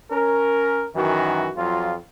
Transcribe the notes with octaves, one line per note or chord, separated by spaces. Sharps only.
C#4 A#4
F#2 D#3 E3 F#4
F2 F#3 F4